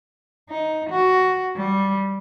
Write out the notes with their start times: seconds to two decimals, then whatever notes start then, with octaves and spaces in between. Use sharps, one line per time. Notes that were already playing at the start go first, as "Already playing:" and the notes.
0.50 D#4
0.90 F#4
1.56 G3